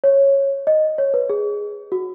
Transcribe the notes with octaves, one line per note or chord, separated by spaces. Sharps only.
C#5
D#5
C#5
B4
G#4
F#4